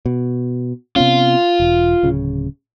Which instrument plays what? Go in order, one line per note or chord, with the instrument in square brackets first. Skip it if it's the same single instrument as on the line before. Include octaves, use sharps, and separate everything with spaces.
[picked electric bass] B2
[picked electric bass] C3 B3 C#4 [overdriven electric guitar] F4
[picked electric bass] E1
D1 C#3